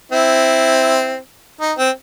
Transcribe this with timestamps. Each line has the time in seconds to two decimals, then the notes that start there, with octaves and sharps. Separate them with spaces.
0.12 C4 E4
1.61 D#4
1.78 C4